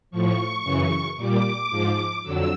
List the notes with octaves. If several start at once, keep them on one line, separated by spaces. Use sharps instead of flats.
A2 F3 C#6
F#2 C#3 E3
A#2 G3 D6
G#2 F3
F2 D3 F#3 E6